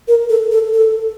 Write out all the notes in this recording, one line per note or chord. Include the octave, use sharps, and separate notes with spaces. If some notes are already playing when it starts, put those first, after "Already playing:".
A#4
A4
A4
A4